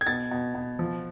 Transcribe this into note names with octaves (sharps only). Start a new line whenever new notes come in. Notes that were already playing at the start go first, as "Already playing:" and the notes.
G#6
B2 A6
B2
B2
F3